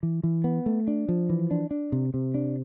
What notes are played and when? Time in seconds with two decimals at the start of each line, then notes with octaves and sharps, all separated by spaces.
0.03 E3
0.23 E3
0.44 B3
0.66 A3
0.87 D4
1.09 F3
1.29 E3
1.51 D4
1.71 D4
1.92 C3
2.14 C3
2.34 D4